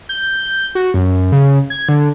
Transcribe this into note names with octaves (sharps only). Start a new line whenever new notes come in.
G6
F#4
F#2
C#3
G#6
D3